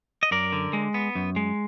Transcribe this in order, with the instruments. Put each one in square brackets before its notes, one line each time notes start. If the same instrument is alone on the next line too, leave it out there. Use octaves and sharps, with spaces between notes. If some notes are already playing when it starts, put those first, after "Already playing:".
[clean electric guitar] D#5
F#2 A#4 D5
D3
G#3
B3
F#2
G#3